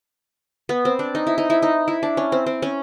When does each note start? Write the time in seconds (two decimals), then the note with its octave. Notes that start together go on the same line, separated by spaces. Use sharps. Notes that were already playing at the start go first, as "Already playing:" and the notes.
0.69 B3
0.85 C4
0.99 D4
1.15 D#4
1.27 E4
1.38 D#4
1.50 E4
1.62 D#4
1.88 E4
2.03 D4
2.17 C#4
2.32 C4
2.46 C4
2.62 C#4